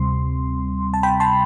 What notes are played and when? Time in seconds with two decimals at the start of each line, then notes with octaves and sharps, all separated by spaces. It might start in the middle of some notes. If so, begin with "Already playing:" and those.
Already playing: D2 C3 G3 C4 C6
0.94 A5
1.03 G5 B5
1.20 A5 C6